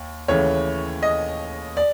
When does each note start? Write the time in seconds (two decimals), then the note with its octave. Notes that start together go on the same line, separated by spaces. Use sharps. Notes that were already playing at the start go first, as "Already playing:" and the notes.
Already playing: D#2
0.28 D#2 C#3 E3 A3 C#5
1.03 D#5
1.77 D5